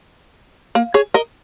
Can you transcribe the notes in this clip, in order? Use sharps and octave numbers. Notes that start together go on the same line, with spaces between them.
A#3
G#4 C#5
A#4 D#5